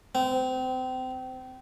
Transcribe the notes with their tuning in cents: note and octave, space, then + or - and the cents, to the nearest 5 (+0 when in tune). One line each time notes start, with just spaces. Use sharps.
C4 -30